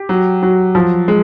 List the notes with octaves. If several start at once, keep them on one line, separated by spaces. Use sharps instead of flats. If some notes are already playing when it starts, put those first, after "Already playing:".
Already playing: G4
F#3
F#3
F3
G#3